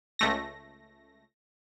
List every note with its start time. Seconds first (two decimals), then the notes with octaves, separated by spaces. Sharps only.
0.19 C#2 A3 A#6